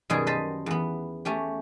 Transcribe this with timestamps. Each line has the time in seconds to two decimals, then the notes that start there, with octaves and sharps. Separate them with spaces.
0.10 F#2 B2 D#3 G3 G#4
0.27 B4 C5 D#5 A5 B5
0.66 E2 B3
1.25 A3 C#4 G4